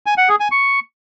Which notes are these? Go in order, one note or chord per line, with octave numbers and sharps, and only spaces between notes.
G#5
F#5
G#4
G#5
C#6